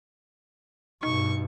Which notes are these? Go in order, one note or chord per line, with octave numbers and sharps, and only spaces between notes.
G2 B2 D#4 C#6